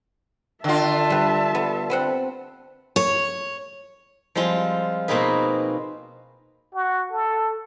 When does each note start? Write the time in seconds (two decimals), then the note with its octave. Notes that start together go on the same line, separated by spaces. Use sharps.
0.64 D3 F4 E5 A5
1.10 G3 B4
1.55 B3
1.90 B3 C4 F#5
2.96 C#5
4.35 F3 G3 G#3 C4 F4
5.08 B2 A#3 C4 D#4 G#4 B4
6.74 F#4
7.12 A4